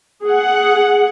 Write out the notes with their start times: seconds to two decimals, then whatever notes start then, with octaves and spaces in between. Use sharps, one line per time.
0.24 G#4 F#5